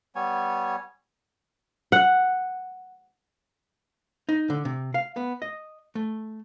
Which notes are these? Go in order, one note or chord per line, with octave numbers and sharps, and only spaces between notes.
G3 B3 C#5 G#5
F#5
D#4
D3
C3
F5
B3
D#5
A3